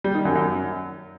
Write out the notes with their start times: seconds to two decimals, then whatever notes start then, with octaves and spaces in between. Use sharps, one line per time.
0.04 G3
0.15 D#3
0.25 F#2
0.35 F#2